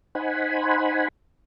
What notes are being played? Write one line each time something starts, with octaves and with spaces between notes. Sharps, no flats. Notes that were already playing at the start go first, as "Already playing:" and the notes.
D#4 C5 F#5 G#5 B5